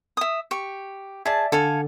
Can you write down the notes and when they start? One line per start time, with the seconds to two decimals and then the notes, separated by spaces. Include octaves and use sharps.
0.17 E5 D#6
0.51 G4 C#6
1.26 G#4 D5 E5 A5
1.52 D3 A4 F5 G#5